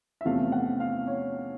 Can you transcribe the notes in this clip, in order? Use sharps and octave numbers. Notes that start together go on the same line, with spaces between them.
E5
E2 C3 F3 A3 C#4 F5
F#5
F5
C#5